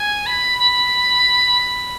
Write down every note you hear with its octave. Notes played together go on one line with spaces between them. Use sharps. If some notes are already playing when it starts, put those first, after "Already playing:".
Already playing: G#5
B5
B5